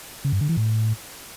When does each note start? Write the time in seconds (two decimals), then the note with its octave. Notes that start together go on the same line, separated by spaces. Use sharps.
0.25 C#3
0.33 G2
0.41 D3
0.49 E3
0.57 A2